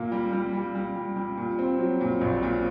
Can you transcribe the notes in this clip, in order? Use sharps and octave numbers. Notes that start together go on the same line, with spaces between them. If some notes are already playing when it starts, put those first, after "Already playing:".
Already playing: A#2 A#3
G3
G3
G3
G3
G3
G3
A#2
C4
F#3
A#2
A#1
A#2